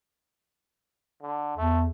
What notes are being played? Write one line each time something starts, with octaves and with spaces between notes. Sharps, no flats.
D3
E2 A3